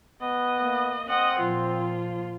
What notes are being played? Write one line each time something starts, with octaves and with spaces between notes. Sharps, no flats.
B3 D#5
A#3
C4 D#5 F#5
A#2 F3 F4